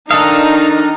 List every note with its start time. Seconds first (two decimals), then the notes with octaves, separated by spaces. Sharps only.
0.11 D#3 D4 D#4 A4 F5 D#6